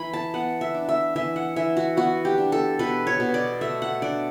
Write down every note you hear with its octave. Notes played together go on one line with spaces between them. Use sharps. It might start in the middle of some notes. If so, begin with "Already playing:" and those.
Already playing: E3 B5
A5
B3 F#5
E5
D4
E5
E3 E5
F#5
E3 E5
F#4
B3 F#4
G4
D4
A4
B2 B4
C#5
B2
D5
A3 E5
F#5
D4 D5